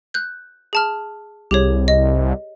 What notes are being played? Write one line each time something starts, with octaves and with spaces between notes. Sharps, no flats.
F#6 G6
G#4 A5 F6
C2 G4 G#4 C#5
D#5